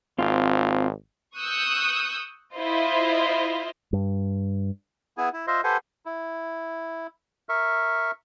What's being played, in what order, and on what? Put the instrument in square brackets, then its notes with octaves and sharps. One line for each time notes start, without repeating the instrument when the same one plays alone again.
[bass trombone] G#1 [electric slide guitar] C4 F4
[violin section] C#6 D#6 E6 F#6 G6
E4 F4 C5 D#5
[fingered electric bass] G2
[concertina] B3 E4 G#4 G#5
E4
F4 C5 D#5 E5
G4 A4 B4 C5 F#5 G#5
E4
A#4 E5 C#6